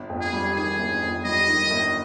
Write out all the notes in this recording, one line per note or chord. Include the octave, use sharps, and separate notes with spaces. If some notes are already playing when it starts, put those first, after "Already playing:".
Already playing: G1
F2
G#4
G3
D#3 G#4
G1
F2
G3 D#5
D#3
G1